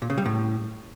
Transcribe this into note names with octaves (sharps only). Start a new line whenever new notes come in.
A#2
C#3
G3
A2